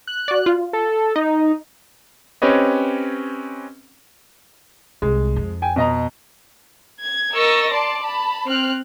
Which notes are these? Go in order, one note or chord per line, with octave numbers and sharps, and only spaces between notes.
F#6
F#4 D5
F4
A4
D#4 D#5
C4 C#4 G4 B4 C#5 D#5
C2 G#3
F2
G5 G#5
B2 D#5 A#5
G#6
A#4 D#5 C#6 E6 A6 A#6
D5 A5 C6
A5 B5
C4 F6 F#6